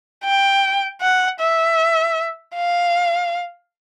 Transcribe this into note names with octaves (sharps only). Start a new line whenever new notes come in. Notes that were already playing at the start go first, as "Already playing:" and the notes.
G5
F#5
E5
F5